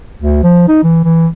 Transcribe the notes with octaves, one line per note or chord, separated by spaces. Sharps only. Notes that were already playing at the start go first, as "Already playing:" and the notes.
D2
F3
D#4
E3
E3